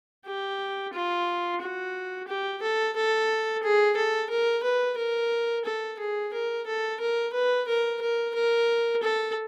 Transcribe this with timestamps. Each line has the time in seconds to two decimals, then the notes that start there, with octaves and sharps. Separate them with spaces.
0.26 G4
0.94 F4
1.61 F#4
2.27 G4
2.62 A4
2.96 A4
3.63 G#4
3.97 A4
4.30 A#4
4.63 B4
4.97 A#4
5.65 A4
5.99 G#4
6.33 A#4
6.67 A4
7.00 A#4
7.34 B4
7.68 A#4
8.02 A#4
8.34 A#4
9.03 A4